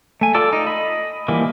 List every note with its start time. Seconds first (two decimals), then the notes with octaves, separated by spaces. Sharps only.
0.21 A3 G#5
0.34 F4 A4 D5 A5
0.53 D#4
0.66 D#5 B5
1.28 E3 F3 G3 A#3